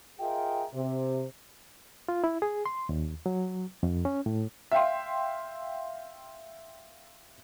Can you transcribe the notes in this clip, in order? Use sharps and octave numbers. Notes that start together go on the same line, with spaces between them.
F4 G#4 A#4 D#5 E5 G5
C3
F4
E4
G#4
C6
D#2
F#3
F2
C#4
A2
E5 F5 G5 C6